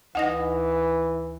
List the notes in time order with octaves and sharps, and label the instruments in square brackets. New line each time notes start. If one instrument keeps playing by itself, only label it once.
[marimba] D2 D#4 A#6 [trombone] E3 [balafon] D#5 F#5